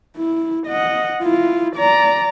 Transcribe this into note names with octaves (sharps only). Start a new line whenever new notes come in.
E4
D#5 F#5
E4 F4
D5 A#5